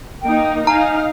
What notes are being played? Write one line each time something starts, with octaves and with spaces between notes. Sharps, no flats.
A#3 D#4 G5
D#4 F5 G#5 A#5